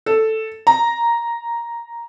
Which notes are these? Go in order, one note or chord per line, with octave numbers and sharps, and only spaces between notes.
A4
A#5